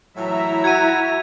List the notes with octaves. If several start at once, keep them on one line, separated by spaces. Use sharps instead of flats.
A2 E3 F#3 E4 E5 A#5
F#4 G#6 D#7